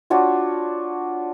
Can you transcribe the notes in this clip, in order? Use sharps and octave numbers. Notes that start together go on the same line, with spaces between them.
D4 F4 F#4 C#5